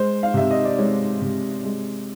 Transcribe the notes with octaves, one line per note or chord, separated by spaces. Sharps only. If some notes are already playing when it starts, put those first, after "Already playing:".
Already playing: G#3 C5
F5
C3 E5
D#5
D5
G#3 C#5
C3
G#3